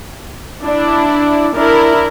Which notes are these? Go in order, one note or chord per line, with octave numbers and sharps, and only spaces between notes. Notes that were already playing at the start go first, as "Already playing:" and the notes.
D4 E4
D4 E4 A#4